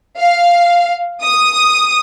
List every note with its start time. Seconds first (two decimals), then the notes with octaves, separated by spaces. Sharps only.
0.19 F5
1.22 D#6